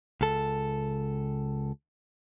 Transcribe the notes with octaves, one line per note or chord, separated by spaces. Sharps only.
C#2 A4